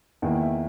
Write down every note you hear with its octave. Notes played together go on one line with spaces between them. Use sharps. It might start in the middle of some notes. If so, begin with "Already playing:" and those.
E2 D#3 A#3 E4 G5
G5
E5